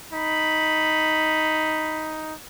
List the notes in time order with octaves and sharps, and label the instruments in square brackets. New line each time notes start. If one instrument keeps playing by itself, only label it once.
[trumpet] D#4 [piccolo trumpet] B5